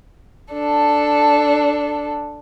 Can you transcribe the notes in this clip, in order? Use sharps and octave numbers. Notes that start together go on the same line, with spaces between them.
D4 A4